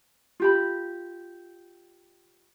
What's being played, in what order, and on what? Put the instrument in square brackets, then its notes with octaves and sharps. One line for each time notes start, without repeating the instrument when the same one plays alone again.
[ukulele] F4 G4 B5